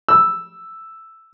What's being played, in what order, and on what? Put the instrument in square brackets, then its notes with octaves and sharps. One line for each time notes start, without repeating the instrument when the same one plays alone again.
[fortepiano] E6